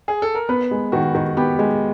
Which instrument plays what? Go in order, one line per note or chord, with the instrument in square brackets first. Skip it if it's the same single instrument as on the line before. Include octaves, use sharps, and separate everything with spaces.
[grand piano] G#4
A4
A#4
[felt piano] B3 [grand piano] B4
[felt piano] G#3
[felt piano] D#3 [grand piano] F#4
[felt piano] D#3
[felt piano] B3 [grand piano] G4
[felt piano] G#3